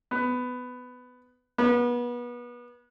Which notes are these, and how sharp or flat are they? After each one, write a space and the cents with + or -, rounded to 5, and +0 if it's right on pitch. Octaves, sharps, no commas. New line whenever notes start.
B3 +15
B3 -30